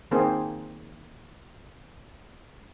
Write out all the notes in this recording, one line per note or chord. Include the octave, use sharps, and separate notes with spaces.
D#3 A#3 C4 D#4 G#4 C5